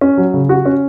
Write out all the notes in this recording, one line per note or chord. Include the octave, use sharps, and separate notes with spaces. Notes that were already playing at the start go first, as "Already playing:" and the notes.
C#4
F#3
C#3
F#4
C#4